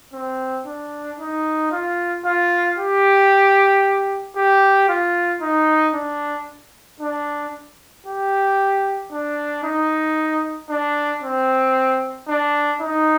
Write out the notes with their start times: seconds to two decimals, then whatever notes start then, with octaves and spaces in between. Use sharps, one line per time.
0.13 C4
0.66 D4
1.19 D#4
1.72 F4
2.25 F4
2.78 G4
4.36 G4
4.89 F4
5.42 D#4
5.94 D4
7.00 D4
8.06 G4
9.12 D4
9.64 D#4
10.70 D4
11.23 C4
12.28 D4
12.82 D#4